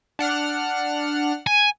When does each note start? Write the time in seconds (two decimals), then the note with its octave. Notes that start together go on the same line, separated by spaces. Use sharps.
0.19 D4 F#5 F6
1.47 G#5